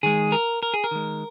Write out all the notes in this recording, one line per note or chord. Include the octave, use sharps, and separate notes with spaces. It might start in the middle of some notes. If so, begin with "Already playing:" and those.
D#3 G#3 G#4
A#4
A#4
G#4
A#4
D#3 G#3